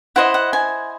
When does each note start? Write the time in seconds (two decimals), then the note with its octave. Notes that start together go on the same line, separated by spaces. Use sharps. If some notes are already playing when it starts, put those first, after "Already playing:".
0.16 E4 C5 D#5 F#5
0.34 F#5
0.53 G#5